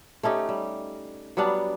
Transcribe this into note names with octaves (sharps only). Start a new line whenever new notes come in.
A3 C#4 D#4 G4
G3
F#3 G3 B3 D4